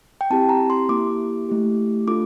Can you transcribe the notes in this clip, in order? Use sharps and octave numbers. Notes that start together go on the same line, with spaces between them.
G5
C4 E4 G4 A5
A#5
C6
A#3 E4 G4 D6
A3 E4 G4
A3 D4 F4 A4 D6